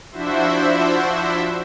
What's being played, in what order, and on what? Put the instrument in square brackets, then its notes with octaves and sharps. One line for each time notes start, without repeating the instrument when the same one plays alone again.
[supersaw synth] F3 D4 E4 F#4 C5 E5